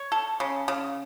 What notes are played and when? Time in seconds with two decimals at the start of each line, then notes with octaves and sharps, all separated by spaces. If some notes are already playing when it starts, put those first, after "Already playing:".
Already playing: C#5
0.12 A4
0.40 C#3
0.68 C#3